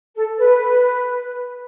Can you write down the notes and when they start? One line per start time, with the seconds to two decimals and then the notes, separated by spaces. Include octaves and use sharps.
0.16 A4
0.40 B4